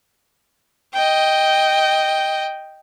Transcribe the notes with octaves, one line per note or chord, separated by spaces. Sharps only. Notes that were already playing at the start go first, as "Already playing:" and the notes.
D#5 G5